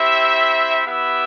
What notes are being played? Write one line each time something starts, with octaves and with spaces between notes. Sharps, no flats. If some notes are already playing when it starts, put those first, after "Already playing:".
Already playing: C4 E4 G4 E5
B3 E4 G4 E5